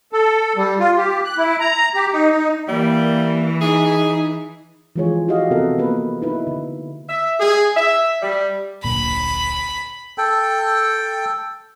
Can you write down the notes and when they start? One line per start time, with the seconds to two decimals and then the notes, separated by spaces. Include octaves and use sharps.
0.13 A4
0.57 G3
0.79 F4
0.97 G4
1.25 F#6
1.38 E4
1.60 A#5
1.95 G4
2.12 D#4
2.31 D#4
2.68 E3 G3 A#3
3.61 D#4 G#4
4.96 E3 F3 G#3 F4 G#4 C#5
5.28 E4 F#4 G4 D#5 F5
5.50 C3 B3 F#4 A4 A#4 F#5
5.78 A#3 B3 B4
6.22 D#4 E4 B4
6.47 D3
7.09 E5
7.40 G#4
7.76 E5
8.22 G3
8.84 D1 A#1 A#2 B5
10.18 A4 G5